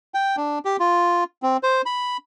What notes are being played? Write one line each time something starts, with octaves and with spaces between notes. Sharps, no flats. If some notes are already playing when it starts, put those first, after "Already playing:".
G5
D4
G4
F4
C4
C5
B5